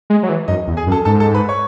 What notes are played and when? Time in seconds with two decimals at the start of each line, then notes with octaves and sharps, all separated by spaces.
0.10 G#3
0.23 F#3
0.29 E3
0.48 F#2 D#4 D#5
0.67 E2
0.77 G#4 G#5
0.87 F#2
0.92 A4 A5
1.05 G#2 A4 A5
1.20 A4 A5
1.34 B4 B5
1.49 C#5 C#6